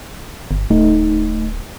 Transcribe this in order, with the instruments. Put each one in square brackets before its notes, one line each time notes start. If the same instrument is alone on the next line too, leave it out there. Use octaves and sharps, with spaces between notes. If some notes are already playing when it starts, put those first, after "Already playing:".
[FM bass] G1
[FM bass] D1 [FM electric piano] A3 D#4